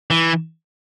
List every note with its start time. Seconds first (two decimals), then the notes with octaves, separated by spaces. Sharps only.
0.10 E3